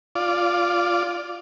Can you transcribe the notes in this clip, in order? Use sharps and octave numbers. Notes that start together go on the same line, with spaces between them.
F4 D5